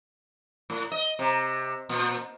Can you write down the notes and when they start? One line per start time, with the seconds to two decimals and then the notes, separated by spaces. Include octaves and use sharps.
0.70 A2
0.92 D#5
1.19 C3
1.89 A#2